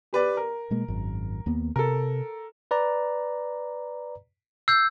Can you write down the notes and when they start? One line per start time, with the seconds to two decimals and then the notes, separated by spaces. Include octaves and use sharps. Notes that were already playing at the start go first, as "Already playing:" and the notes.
0.13 G4 B4 D5
0.37 A#4
0.71 B2 G#3 A#3
0.88 G#1 F#2
1.46 D#2 A#3 B3
1.76 C3 A4 A#4
2.71 B4 D5 A#5
4.68 E6 G6 C7